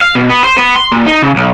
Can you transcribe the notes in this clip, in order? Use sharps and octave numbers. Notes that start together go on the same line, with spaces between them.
F5
B2
B3
C5
B3
C6
A#2
D#4
C#3
B1